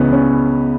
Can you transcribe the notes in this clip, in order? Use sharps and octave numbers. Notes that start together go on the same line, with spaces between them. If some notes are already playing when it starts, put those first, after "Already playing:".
Already playing: C#2 C#3 E3 B3 C#4
C#4